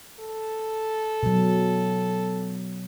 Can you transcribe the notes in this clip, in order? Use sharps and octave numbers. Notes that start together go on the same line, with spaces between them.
A4
B2 F#3